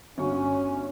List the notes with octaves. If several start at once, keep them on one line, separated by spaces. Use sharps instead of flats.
G1 C#4 F#4 C#6